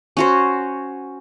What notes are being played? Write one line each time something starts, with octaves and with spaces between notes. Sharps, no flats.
C#4 F#4 C5